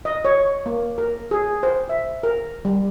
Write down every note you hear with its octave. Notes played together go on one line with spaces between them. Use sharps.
D#5
C#5
A#3
A#4
G#4
C5
E5
A#4
G3